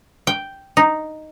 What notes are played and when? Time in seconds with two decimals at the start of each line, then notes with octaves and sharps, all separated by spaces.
0.27 G5
0.77 D#4